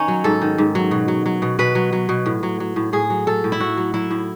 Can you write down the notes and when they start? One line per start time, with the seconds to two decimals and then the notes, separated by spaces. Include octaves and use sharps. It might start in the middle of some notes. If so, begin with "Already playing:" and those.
Already playing: D#3 C#4 D#4
0.08 F#3
0.24 G#2 A4
0.42 D#3
0.58 G#2
0.75 F#3
0.91 B2
1.08 F#3
1.26 F#3
1.42 B2
1.59 B2 B4
1.75 F#3
1.93 F#3
2.09 B2
2.26 A2
2.43 F#3
2.60 F#3
2.76 A2
2.93 A2 G#4
3.10 F#3
3.27 F#3 A4
3.44 A2
3.52 E4
3.60 A2 F#4
3.77 F#3
3.94 F#3 E4
4.11 A2